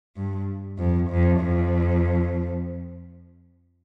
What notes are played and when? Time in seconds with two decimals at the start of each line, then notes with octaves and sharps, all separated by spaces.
0.16 G2
0.78 F2
1.10 F2
1.40 F2